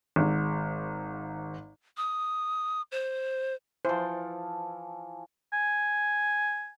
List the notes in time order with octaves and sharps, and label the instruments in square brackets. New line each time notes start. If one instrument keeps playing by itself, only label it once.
[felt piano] G#1 G#2
[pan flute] D#6
C5
[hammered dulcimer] E3 F3 [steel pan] C5
[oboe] G#5